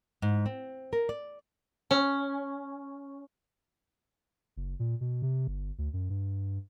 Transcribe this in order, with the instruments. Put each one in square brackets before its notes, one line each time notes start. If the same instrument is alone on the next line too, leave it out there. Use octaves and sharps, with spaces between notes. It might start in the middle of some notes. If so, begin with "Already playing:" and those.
[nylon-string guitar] G#2
C4
A#4
D5
[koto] C#4
[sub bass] F#1
A#2
B2
C3
G1
D2
F#2
G2